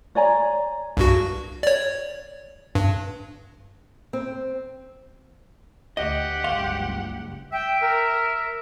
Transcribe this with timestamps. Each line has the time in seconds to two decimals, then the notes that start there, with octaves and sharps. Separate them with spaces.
0.15 C#5 D5 G#5 A#5
0.97 C2 G2 F#4
1.63 C#5 D5
2.75 G2
4.13 C4
5.97 D2 G4 D#5 F#5
6.44 F#1 C#2 G2 F5 C6
7.52 E5 G5
7.81 A#4